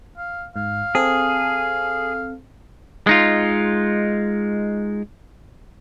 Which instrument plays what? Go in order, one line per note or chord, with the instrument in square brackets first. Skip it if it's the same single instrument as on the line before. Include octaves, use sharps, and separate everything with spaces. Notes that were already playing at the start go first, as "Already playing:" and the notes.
[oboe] F5
[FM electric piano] G#2 [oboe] F5
[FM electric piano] C4 A4 [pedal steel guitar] G#4
[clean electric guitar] G#3 D#4 F4